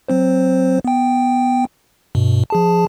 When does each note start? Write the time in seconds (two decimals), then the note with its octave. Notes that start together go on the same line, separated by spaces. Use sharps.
0.08 F#3 C4 C5
0.85 B3 G5
2.15 G2 B2
2.50 F3 G#4 A5